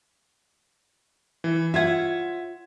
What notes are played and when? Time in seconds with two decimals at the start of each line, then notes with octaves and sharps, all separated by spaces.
1.44 E3
1.74 F4 C#5 E5 F#5 G#6